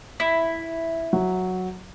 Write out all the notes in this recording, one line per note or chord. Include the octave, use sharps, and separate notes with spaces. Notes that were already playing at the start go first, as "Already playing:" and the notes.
E4
F#3